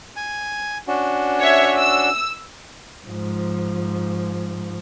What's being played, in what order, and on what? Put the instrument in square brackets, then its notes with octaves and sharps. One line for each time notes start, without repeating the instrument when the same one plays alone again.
[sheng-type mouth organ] G#5
C#4 D4 F#4
[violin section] C#5 E5
E6
[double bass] G#2 F3